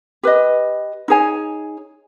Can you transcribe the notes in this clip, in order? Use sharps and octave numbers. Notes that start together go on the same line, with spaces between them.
G4 B4 D#5
D#4 G#4 C#5 G#5